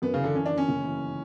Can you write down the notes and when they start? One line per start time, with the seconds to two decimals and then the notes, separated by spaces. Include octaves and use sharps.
0.02 F#2 B3
0.14 C#3 E3
0.24 D3
0.35 E3 C#4
0.46 D4
0.51 G1
0.58 C#4
0.69 F#1
0.84 E3